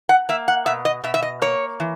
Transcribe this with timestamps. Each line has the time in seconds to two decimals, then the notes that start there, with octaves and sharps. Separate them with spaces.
0.09 F#5
0.29 A#3 E5
0.48 F#5
0.66 B2 E5
0.85 D#5
1.04 B2 E5
1.14 E5
1.22 D#5
1.42 A#3 C#5
1.80 E3